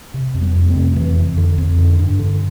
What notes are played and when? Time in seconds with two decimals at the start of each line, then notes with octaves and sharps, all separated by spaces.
0.14 C3
0.34 F2
0.41 G3 B3
0.55 F2
0.69 A3 C4
0.76 C3
0.96 F2 E3
1.17 F2
1.38 D3
1.58 F2
1.78 D3
1.99 G2
2.19 D3